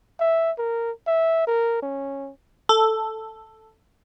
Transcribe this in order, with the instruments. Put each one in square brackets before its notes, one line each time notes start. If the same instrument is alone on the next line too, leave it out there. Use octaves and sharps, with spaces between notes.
[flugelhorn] E5
A#4
E5
A#4
C#4
[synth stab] A4